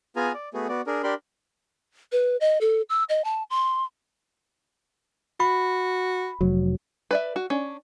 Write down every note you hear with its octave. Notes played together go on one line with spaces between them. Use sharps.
B3 F4 G#4 G#5 A#5
D5
A3 B3 F#4 G#4
B3 F#4 D5
D4 G#4 A#4
D4 G4 A#4 D5 B5 C6
B4
D#5
A4
E6
D#5
A5
C6
F#4 B5
F1 F#3
B4 D5 E5
F#4
C#4 D4